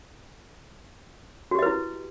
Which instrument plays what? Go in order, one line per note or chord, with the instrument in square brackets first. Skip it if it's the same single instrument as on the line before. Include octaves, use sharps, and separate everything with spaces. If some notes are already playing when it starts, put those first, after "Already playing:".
[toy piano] F#4
G4
D#5
B4
E4